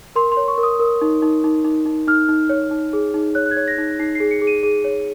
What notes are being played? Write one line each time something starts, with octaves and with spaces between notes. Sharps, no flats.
A#4 C6
C6
C#5
C#6
A#4
D#6
A#4
D#4
D#4
D#4
D#4
D#4
D#4 F6
D#4
C#5
D#4
G#4
D#4
C#5 F#6
F#6
G#6
C#5
A#6
D#4
D#4 C7
G#4 C7
C#7
G#4
D#7
G#4 D#7
C#5